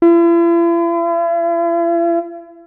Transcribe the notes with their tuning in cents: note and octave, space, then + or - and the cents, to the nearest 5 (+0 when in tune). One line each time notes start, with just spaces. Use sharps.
E4 +45